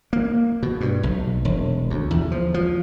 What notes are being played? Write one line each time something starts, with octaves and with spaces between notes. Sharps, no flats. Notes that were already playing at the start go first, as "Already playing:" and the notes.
A#3
B2
G2
B1
E1
D2
E2
F3
F3